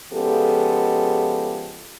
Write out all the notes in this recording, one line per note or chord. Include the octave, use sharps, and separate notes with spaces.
C#3 F3 G#3 B3 G4 A4